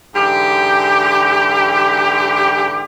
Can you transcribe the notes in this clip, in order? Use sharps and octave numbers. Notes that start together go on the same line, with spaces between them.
G#2 D3 E3 G4